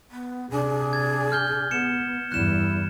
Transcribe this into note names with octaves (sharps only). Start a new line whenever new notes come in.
B3
C3 D4 G#4
G#6 A6
F6 G6 G7
B3 C#7 E7
E2 G2 E4 F#6 E7